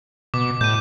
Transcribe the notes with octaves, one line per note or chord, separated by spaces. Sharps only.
B2 D6
A2 G6 D#7